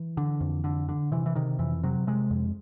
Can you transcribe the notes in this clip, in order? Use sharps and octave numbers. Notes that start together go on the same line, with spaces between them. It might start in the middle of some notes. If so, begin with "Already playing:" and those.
Already playing: E3
D3
F2
D3
D3
C3 E3
E3
C3 D#3
F2 E3
C3 F#3
C3 G#3
F2